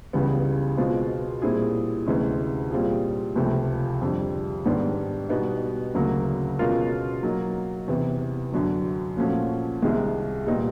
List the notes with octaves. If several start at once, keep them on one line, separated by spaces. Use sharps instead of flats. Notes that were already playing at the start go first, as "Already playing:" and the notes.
C#2 C#3 E3 G3 B3
B2 G#3 C4 F4
A#2 G3 C4 E4 G#4
D2 C3 E3 G#3 C#4
A#2 G3 C4 F4 G#4
C#2 C3 F3 A3 C4
F2 D3 G3
G#2 D#3 G3 B3 D4
B2 G3 B3 D#4
D2 C#3 F#3 A#3
B2 G#3 C#4 F4 A#4
F#3 A#3 D#4
E2 C3 E3
F#2 D3 F#3
A#2 F3 A3 C#4 F#4
C2 C3 D#3 G#3
A#2 G3 B3 D#4